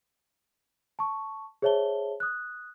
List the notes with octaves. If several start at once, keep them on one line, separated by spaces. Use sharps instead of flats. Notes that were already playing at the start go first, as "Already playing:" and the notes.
A5 C#6
G#4 C5 C#5 E5 A5 G7
D#6 F#6